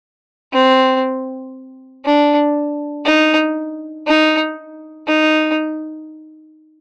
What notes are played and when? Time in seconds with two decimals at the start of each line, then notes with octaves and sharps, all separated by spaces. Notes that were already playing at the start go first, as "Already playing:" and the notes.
0.53 C4
2.05 D4
3.05 D#4
4.07 D#4
5.07 D#4